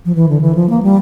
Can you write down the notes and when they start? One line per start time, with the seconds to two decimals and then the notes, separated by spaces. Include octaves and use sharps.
0.05 F3
0.15 E3
0.29 D3
0.41 E3
0.55 F3
0.70 A#3
0.83 G3